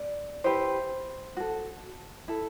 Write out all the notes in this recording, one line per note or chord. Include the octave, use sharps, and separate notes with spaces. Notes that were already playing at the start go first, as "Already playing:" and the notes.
Already playing: D5
E4 G4 B4 C5
F#4 A4
E4 A4